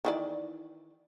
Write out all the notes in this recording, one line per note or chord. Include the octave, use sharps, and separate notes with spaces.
D#3 E3 D5